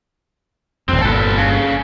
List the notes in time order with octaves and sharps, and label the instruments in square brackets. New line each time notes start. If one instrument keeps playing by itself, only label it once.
[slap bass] E1 F2 [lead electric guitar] C4
[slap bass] G1 A#2 [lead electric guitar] A4 B4
[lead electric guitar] C#3